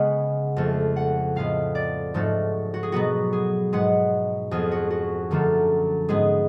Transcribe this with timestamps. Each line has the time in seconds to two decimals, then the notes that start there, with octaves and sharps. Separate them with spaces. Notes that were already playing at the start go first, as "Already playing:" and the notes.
Already playing: C#3 G#3 B3 F#5 G#5
0.56 F2 F3 A3
0.96 F#5
1.36 A2 G#3 B3 F5
1.75 D5
2.14 G#2 F3 A3 F#4
2.74 F#4
2.83 G#4
2.92 B2 F#3 B3 F#4
3.33 G#4
3.73 G#2 G#3 B3 F#5
4.51 F2 F3 B3 G#4
4.71 F#4
4.90 F#4
5.31 F#2 D3 F3 A3
6.09 G#2 G#3 B3 G#4